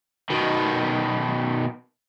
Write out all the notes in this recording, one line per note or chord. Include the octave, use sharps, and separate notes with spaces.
B2 D#3